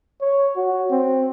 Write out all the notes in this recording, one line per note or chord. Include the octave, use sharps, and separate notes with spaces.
C#5
F#4
C4